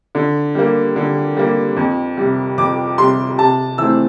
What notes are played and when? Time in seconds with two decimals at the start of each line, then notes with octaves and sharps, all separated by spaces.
0.15 D3
0.55 G3 A#3
0.96 D3
1.37 G3 A#3
1.76 F2
2.17 C3 G3
2.58 F2 D6
2.98 C3 G3 C6
3.38 C3 A5
3.78 E3 A3 C4 E6